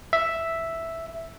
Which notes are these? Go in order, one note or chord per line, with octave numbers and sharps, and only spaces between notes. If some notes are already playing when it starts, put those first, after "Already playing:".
E5